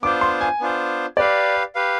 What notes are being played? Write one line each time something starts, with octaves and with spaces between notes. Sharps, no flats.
B3 D4 F4 C5 D6
C6
G#5
B3 D4 F4 C5
G4 B4 D5 F5
G4 B4 F5